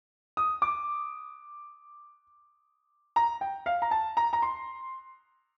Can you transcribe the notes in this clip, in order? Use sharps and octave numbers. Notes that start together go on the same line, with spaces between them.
D#6
D6
A#5
G5
F5
A#5
A5
A#5
A#5
C6